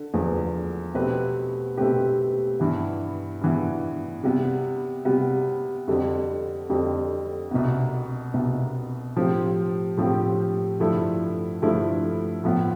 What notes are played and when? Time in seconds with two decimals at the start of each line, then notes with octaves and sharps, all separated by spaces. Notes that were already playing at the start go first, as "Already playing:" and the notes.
Already playing: D3
0.14 E2 D3 F3
0.95 B2 A3 C4 G4 B4
1.77 B2 A3 C4 G4 B4
2.60 G2 E3 B3
3.41 G2 E3 B3
4.23 C3 G3 B3
5.05 C3 G3 B3
5.88 F2 D3 G3 C4
6.70 F2 D3 G3 C4
7.51 C2 B2 B3
8.34 C2 B2 B3
9.16 A2 F3 C4 G4
9.97 A2 F3 C4 G4
10.80 G2 D3 F3 A3 E4
11.62 G2 D3 F3 A3 E4
12.44 A2 F3 B3